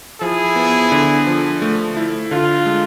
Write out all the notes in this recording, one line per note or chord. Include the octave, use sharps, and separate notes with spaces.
F3 E4 G#4
B3
D3
F3
A3
E4
D3 F4
G#3